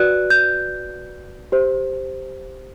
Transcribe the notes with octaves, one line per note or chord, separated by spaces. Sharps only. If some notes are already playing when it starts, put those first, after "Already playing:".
Already playing: F#4 B4 D5 F#6
G6
G4 C5